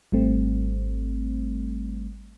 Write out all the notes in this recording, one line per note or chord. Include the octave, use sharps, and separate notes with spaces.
G#1 G3 A3 C4